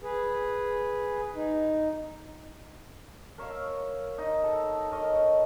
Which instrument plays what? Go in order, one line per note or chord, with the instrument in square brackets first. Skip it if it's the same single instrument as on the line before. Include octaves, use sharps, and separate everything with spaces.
[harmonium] G#4 B4
D#4
[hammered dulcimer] A#4 C#5 E5 F5
D#4
A4
A#4 C#5 D#5